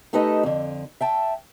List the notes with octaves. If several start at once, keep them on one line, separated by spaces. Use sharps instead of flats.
A3 D#4 G4 A4 B4 D#5
F2 D3
E5 G5 A5